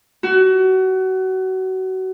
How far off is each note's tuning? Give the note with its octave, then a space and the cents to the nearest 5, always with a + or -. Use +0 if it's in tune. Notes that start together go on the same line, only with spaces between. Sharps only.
F#4 +25